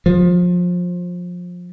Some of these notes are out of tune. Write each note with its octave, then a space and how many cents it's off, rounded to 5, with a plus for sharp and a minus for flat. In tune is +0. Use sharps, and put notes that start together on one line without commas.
F3 +25